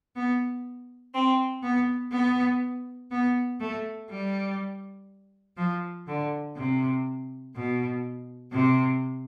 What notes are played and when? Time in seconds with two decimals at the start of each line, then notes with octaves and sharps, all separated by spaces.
0.15 B3
1.14 C4
1.62 B3
2.11 B3
3.11 B3
3.59 A3
4.09 G3
5.56 F3
6.07 D3
6.55 C3
7.54 B2
8.52 C3